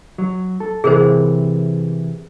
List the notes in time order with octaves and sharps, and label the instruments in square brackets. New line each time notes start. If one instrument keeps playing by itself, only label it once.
[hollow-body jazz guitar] F#3
A4
[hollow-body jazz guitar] C3 E3 [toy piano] G#4 A#4 C5